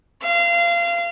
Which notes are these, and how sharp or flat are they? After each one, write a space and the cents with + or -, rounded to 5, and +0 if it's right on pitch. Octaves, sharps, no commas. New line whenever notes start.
F5 -25